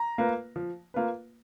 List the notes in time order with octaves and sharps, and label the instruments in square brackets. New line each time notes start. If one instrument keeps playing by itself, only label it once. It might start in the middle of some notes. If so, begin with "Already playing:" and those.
Already playing: [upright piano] A#5
[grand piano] A#3 F4 B4
F3
A#3 F4 B4